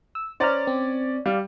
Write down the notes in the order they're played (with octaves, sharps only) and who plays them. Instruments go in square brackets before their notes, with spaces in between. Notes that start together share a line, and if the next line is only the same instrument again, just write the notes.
[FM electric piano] E6
[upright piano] C#4 D5 [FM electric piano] C5 A#5 F6
[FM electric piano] C4
[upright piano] G3 [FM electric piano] D5 F5